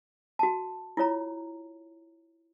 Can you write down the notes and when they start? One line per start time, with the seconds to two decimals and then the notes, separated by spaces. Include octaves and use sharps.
0.39 F#4 A5
0.97 E4 F4 C#5 A#5